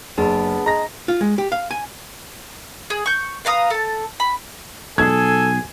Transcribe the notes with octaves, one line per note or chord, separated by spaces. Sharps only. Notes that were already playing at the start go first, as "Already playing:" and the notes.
F#1 B3 D4 G#4 A5
G#3 A#5 A#6
F4
G#3
G4
F5
G#5
G#4
C#6 G6
B4 F5 A#5 D#6
A4 A5
B5
B1 G#4 A4 G#5 G#6